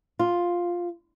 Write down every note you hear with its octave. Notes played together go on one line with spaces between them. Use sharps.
F4